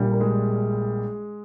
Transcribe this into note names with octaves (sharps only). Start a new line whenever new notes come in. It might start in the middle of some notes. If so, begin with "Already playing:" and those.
Already playing: A#1 A#2 G3
A#4
G#3 G#4